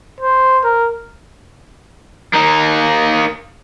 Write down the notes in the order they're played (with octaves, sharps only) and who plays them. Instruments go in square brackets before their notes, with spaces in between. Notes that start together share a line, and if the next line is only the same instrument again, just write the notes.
[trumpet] C5
A#4
[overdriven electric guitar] A#3 D#4